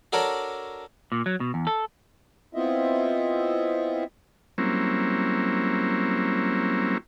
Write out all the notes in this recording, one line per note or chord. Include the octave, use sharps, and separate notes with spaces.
D4 F#4 A4 A#4 C#5 D5
A#2
F#3
B2
E2
A4
B3 C4 E4 F4 D#5 E5
F#3 G3 A#3 C4 C#4 E4